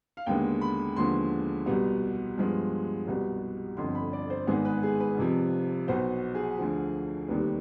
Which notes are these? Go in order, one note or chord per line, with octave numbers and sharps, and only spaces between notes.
F5
D#2 D3 G#3 B3 G5
B5
D#2 D3 F3 G#3 B3 C6
C2 B2 G3 B3
G2 F3 G#3 B3
C2 B2 G3 B3
G1 F2 D3 C6
B5
D5
C5
G#1 G#2 D#3 G#3 B3 G#4
B4
G#4
B4
F2 C3 F3
B1 B2 B3 C5
G#4
D2 D3 F3
F1 D#2 D#3 G3 B4